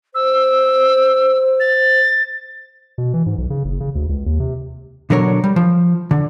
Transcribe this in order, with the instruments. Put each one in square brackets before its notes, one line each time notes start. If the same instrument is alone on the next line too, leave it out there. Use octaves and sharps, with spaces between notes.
[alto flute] C5 [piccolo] E6
[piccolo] A6
[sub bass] B2
E3
G#2
B1
C#3
F#1
C#3
D2
C#2
D#2
C3
[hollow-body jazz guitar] B2 D3 F#3 A#4 C#5
G3
F3
D3